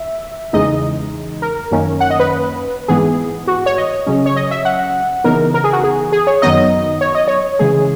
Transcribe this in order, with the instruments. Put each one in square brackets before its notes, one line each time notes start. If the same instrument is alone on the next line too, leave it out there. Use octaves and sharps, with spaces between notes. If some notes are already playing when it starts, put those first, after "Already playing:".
Already playing: [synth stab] E5
E2 C#3 E3 G#3 D#4 D#5
A#4
F#2 D#3 A#3 C#4
F#5
D#5
B4
G#2 E3 B3 G#4
F#4
C#5
D#5
C#3 F#3 C#4
C#5
D#5
E5
F#5
C#3 E3 B3 D#4 A#4
A#4
G#4
F#4
G#4
G#4
C#5
F#2 D#3 F#3 B3 D#4 D#5
C#5
D#5
C#5
C#3 E3 G#3 G#4